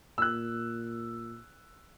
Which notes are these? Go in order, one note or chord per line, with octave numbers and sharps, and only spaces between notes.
A#2 E6 F#6